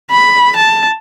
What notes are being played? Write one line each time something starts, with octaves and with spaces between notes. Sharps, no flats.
B5
A5